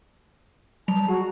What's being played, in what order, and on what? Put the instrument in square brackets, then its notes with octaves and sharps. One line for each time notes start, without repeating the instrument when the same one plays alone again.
[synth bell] F#3 G3 F7 [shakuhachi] A5
[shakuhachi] F#4 [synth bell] G#4 A#5